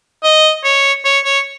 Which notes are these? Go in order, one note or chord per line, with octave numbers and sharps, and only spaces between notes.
D#5
C#5
C#5
C#5